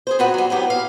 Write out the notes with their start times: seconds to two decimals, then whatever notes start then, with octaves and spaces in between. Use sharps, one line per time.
0.07 G#4 B4 C5
0.19 A#2 B3 F#4 B4 F#5 G5
0.34 F#3 G3
0.50 A2 F#3 B3 G4
0.70 F5